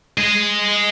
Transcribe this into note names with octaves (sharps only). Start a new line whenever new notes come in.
G#4 D#5